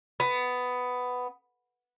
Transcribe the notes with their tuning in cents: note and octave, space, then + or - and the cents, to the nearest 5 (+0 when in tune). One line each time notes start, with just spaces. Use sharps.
B3 +10